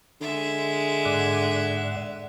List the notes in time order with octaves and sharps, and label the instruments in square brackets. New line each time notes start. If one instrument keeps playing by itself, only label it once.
[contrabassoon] D3 [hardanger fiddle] G#3 E5
[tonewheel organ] G#2 D5 F#5